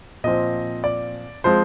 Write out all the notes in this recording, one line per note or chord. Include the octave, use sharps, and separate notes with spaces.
A#2 F3 C4 D#5
D5
F3 G#3 C4 C5